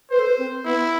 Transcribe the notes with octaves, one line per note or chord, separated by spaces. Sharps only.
B4 C5
A4
B4
C4
B3 E4